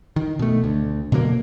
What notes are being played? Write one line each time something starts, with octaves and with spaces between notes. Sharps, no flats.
D#3
B2 A3
D2
B2 D3 F#3 A#3